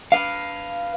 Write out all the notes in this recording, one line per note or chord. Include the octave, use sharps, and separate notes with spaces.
B4 F5